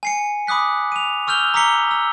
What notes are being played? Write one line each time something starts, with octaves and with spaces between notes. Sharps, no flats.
G#5 C7 C#7
B5 D6 D#6 F#6 B6
D#7 F7
C#6 E6 F6 G6 F7 G7
A#5 D6 E6 B6 C#7 G7
E6